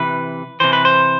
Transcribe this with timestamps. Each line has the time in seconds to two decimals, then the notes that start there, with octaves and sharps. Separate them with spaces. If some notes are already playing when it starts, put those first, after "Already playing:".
Already playing: C3 E3 B4
0.60 C3 E3 C5
0.73 B4
0.85 C5